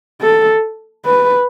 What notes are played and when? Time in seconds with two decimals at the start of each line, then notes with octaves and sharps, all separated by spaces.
0.22 A4
1.05 B4